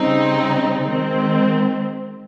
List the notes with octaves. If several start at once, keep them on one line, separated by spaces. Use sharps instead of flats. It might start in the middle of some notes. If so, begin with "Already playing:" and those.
Already playing: C#3 G3 C4 D#4
D#3 G#3 C4